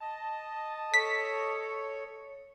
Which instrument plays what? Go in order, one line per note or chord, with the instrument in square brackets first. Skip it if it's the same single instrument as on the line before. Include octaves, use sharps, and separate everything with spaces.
[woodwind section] D#5 A5
[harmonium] A4 C#5 [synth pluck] B6